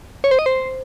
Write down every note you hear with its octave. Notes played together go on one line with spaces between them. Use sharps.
C#5
C5
D#5
C5